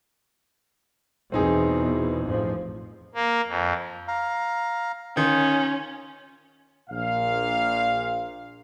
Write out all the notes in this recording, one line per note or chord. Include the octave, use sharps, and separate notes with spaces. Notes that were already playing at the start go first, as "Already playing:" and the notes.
E2 B2 C4 D#4 G#4
A1 F2 F3
A#3
F2
F5 A#5
D#3 C#4 F4
A#1 A#2 F5